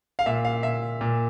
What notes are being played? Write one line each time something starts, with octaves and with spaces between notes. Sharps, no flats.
F5
A#2 E5
F5
A#2 E5
A#2